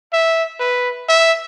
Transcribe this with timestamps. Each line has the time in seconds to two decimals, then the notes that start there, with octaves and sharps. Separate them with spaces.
0.13 E5
0.60 B4
1.09 E5